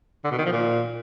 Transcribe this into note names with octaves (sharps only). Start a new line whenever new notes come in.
D3
B2
D#3
F3
A#2